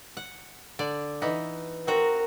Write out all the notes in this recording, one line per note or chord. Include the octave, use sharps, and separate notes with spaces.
F#5
D3 D5
E3 B3 D#4
C4 F#4 A#4 A#5